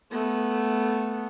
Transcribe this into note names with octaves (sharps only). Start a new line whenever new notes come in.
A3 B3